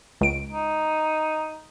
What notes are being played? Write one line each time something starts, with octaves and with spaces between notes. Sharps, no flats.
C#2 D7
D#4